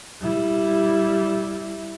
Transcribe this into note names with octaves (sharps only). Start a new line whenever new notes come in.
G3 E4